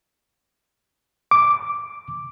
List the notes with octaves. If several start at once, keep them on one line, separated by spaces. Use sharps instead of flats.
D6